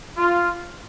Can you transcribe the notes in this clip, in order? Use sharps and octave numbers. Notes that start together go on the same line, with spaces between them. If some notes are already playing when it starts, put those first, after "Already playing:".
F4